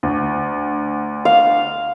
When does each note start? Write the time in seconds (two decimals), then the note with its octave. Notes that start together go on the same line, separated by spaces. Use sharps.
0.03 D2
1.25 F5